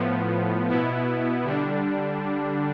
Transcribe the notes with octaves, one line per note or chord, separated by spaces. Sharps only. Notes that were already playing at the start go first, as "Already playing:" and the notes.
Already playing: A2 F3 B3
B2 B3 E4
D3 G3 D4